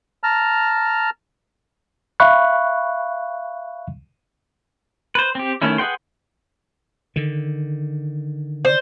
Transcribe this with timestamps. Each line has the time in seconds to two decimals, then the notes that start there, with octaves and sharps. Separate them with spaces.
0.24 A5 A#5 F6
2.20 E5 F5 B5 C#6 F#6
5.15 B4 C5
5.35 C4 G4
5.62 D#3 A3 C#4 E4
5.78 G#4 B4 F#5 G5 C6
7.16 D3 D#3
8.65 C5